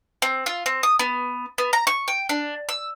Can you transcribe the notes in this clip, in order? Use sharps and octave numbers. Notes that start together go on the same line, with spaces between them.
C4
F4
C4
D#6
B3
B3
A#5
C#6
G5
D4
E6